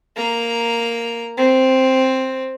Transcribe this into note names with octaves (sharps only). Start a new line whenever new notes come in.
A#3 A#5
C4